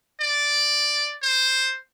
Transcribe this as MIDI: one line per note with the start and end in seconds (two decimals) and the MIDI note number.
0.21 1.14 74
1.22 1.77 72